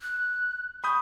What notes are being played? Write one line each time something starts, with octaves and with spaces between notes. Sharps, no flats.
F#6
B5 C#6 D#6 G6